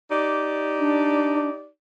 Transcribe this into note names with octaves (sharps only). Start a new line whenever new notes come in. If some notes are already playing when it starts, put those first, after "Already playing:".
D#4 G4 D5
D4